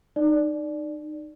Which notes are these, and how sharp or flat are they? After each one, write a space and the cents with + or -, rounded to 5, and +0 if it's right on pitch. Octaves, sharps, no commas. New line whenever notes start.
D#4 -25 D5 +0